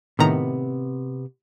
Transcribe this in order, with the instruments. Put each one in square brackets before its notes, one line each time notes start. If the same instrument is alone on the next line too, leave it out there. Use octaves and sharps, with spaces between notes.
[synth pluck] A2 D#3 A#5 [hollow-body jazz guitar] C3 B3